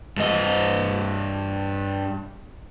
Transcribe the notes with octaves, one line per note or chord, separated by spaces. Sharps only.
G2 D#5